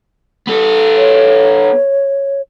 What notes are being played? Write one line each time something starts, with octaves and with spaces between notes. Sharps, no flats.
B3 A4
C#5